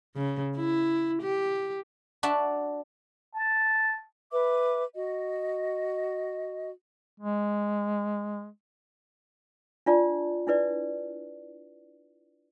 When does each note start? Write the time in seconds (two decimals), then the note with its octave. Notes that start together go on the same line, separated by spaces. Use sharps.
0.16 C#3
0.56 E4
1.22 G4
2.23 D4 F#4 E5 A5
3.34 A5
4.31 B4 E5 D6
4.96 F#4 D#5
7.20 G#3
9.86 D4 F4 D5 A5
10.47 D4 E4 B4 D5